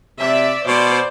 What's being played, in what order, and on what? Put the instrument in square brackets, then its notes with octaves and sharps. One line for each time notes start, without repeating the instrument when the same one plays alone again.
[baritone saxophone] C3 [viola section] D5 E5
[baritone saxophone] B2 [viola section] C5 D5